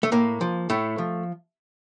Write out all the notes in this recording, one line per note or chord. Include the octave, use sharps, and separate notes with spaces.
A3
A2 A#3
F3
A2 A3
F3